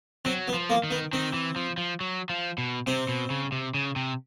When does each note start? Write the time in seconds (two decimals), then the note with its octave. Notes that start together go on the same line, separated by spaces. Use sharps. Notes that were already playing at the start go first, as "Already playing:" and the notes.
0.25 F#3 C4
0.48 B3
0.54 F3
0.70 A#3
0.84 D#3
0.91 B3
1.13 D#3 C4
1.34 E3
1.56 F3
1.78 F3
2.01 F#3
2.30 F3
2.58 B2
2.87 C3 C4
3.08 B2
3.30 C#3
3.52 C3
3.74 C#3
3.96 C3